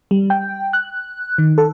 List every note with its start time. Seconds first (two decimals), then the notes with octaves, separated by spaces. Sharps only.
0.11 G3
0.30 G5
0.73 F#6
1.38 D#3
1.58 A4